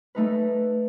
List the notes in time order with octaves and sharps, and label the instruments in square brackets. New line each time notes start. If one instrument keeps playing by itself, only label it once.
[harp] A3 D#4 B4